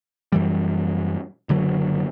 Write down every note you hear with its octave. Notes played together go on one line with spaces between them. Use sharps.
F#2 E3 G3
F#1 D3 F#3